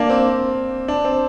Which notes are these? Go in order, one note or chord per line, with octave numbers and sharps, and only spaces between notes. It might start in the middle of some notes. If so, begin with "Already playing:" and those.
Already playing: A#3 D4
C4
D4
C4